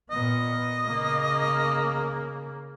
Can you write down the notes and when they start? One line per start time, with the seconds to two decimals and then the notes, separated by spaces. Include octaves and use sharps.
0.11 A#2 B3 D#5
0.87 C#3 A#3